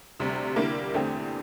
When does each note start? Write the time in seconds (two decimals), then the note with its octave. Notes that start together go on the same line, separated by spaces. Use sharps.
0.20 D2 C3 G3
0.56 D3 G3 A#3 E4
0.94 E2 D3 A3 C4 G4